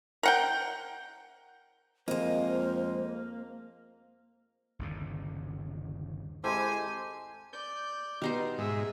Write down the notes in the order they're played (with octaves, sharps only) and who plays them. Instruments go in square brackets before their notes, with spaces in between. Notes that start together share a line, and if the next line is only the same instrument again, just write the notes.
[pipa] A#4 F#5 G5
[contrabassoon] F2 [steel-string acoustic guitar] G#3 D#5 [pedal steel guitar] A#3 [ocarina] C5
[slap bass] G1 D#2 C#3
[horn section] G#3 G4 C5 [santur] C4 E4 A4 [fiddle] G#5
[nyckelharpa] D5 [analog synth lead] G6
[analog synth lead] B2 [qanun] G3 D#4 C5
[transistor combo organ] G#2 [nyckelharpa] G#4 E5